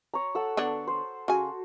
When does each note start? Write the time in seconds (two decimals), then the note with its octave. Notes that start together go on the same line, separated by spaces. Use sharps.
0.14 C#5 A#5
0.35 A4 F#5 E6
0.57 D3 B3 D4
0.87 C5
1.28 C#3 F#4 G#5